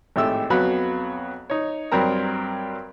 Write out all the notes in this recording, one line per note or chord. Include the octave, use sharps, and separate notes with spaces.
G#1 A2 G4 E5 E6
F2 F#3 B3 F#4 F5 B5
D#4 C#5
G2 F#3 G3 C4 A#4 A#5